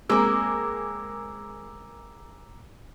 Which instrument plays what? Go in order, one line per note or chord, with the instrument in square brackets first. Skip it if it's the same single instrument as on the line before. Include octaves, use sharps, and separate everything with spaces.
[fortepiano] G#3 C4 [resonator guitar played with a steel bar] A#3 A#4 [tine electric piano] A#5 D6 E6